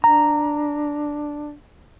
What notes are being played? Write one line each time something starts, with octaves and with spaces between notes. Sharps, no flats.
D4 A#5